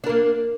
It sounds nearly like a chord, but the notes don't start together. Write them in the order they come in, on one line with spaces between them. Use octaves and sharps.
D4 A#4 A#3